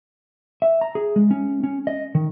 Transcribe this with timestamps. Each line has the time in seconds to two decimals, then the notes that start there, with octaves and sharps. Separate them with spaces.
0.62 E5
0.81 A#5
0.95 G#4
1.16 G#3
1.31 C#4
1.63 C#4
1.87 D#5
2.15 D#3